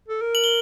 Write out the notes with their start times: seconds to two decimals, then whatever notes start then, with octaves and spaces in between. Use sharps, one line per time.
0.08 A4
0.21 A#4
0.35 F#7
0.44 G7